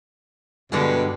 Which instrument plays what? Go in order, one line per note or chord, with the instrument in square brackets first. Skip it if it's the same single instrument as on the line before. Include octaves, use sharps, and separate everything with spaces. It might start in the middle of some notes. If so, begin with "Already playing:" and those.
[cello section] G2 [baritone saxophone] B2 [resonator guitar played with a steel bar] D3 G3 G#3